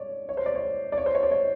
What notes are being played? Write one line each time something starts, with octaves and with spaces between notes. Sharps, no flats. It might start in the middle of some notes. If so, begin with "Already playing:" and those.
Already playing: C#5 D5
C#5
C5
D5
C#5
D5
C#5
C5
C#5
D5
C#5